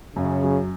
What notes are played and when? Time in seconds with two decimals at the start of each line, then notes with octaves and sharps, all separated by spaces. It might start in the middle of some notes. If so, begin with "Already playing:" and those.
0.16 F#2 C#3
0.44 F#3